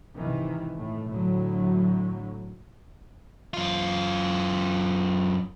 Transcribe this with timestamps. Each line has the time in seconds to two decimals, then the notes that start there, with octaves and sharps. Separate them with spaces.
0.18 G#2 C3 D#3 E3
0.77 A2 A3
1.08 A2 D3 F#3
3.54 F#2 F4